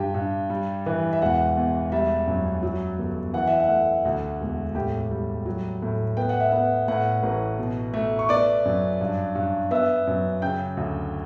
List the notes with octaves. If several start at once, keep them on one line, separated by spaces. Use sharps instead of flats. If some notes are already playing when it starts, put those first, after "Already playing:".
Already playing: G2 G4 G5
G2
G3
E3
E5
E1 F#5
E2
G3 E5
F#2
F#3
G1
E3 F#5
E5
F#5
A3
D2
E1
A2 G4 G5
G3
F#3
A2
B3 G5
F#5
E5
B3 F#5
A2 F#5
A1
B2
A3
C#6
B3 D5 D6
F#2
G2
G2
B3 E5 E6
F#2
C#3 G5 G6
D2